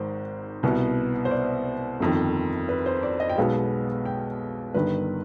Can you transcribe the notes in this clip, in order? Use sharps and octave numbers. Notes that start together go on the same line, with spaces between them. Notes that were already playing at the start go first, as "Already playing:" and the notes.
Already playing: G#1 G#2 D#3 C5
C2 B2 B3
C5
D5
G1 F2 D#3
B4
C5
D5
D#5
G5
B1 B2 G#3 B3 F5
G5
G1 G2 D#3 B4